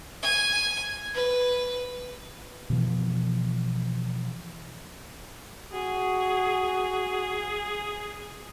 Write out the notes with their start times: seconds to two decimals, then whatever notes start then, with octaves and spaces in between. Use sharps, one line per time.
0.23 G#5
1.14 B4
2.70 B2 E3 F3
5.73 F#4 G#4